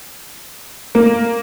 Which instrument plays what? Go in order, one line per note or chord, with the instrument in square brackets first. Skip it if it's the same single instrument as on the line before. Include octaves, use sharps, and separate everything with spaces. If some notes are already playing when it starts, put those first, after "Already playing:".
[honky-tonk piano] A#3